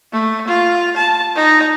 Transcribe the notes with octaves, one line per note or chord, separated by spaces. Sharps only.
A3
F4
A5
D#4